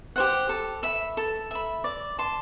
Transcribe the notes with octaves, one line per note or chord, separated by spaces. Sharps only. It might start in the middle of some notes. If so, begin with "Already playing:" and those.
G4 C5 F#5
A4
E5 B5
A4
E5 B5
D5
A5 C6